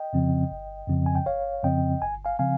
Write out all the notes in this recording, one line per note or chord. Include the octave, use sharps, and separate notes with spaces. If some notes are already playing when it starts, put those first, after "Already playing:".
Already playing: D#5 G5
F2 C#3 F3 C4
G1
F2 C#3 F3 C4
G#5
G5
G1 C#5 F5
F2 C#3 F3 C4 D#5 G5
G1 G#5
F5 G#5
C#3 F3 C4 F5 G#5